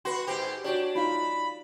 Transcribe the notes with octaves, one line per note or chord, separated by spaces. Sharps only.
F#4 B4 C6
G#2 G4 C5
D4 F#4 G4 C#5
D#4 F4 F5 B5